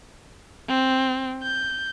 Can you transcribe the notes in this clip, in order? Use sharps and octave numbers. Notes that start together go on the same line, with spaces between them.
C4
G6